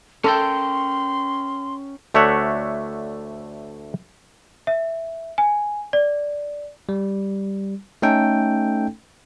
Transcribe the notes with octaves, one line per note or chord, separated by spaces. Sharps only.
C#4 A4 A#4 G5 C6
D2 A3 D4 C#5 E5 F#5
E5
G#5
D5
G3
A3 C#4 D#4 A4 G5